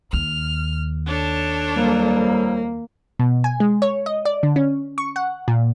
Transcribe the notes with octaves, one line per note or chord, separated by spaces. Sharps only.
D#2 F6
D4 A4 C#5
F2 F#3 G3 A#3
B2
G#5
G#3
C#5
D#5
D5
D3
C#4
C#6
F#5
A#2